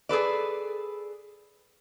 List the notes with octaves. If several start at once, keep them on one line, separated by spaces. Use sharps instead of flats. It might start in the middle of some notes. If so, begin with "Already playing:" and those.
G#4 A4 B4 D5